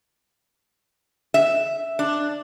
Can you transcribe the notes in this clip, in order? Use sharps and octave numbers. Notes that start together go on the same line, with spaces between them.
E5
D4